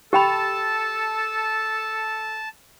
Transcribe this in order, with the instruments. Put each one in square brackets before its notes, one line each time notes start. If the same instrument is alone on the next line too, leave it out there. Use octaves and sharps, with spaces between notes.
[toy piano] G4 G5 B5 [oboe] A4 [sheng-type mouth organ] A5